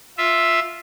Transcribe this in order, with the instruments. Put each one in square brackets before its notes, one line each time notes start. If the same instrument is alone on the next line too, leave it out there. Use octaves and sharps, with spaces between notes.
[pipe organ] F4 E5